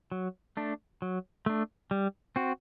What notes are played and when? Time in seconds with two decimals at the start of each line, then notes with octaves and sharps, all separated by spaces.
0.12 F#3
0.57 A3 D4
1.02 F#3
1.46 A3 D4
1.91 G3
2.36 C4 F#4